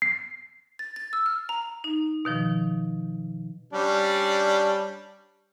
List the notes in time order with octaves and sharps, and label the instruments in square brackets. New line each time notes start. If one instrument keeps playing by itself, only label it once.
[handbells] C7
[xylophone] A6
A6
E6
F6
A#5
[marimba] D#4
B2 D#3 F3
[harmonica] G3 C#4 D4